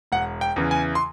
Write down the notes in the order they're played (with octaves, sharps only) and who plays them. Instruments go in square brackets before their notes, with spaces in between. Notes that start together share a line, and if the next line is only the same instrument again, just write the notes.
[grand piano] E1 F#5
G5
E2 C#3 E3
G#5
C6